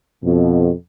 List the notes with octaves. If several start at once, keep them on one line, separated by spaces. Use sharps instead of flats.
F2 B2